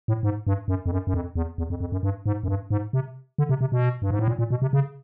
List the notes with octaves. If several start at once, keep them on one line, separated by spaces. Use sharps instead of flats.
A2
G#2
G2
F#2
F2
F#2
F#2
F2
E2
E2
F2
F2
F#2
G2
G#2
F#2
G2
G#2
C3
D3
C3
C3
B2
G2
G#2
A2
A#2
A#2
B2
C3
C#3